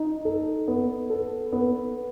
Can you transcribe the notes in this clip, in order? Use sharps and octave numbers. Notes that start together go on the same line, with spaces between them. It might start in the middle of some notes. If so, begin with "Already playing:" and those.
Already playing: D#4
A4
B3
A4
B3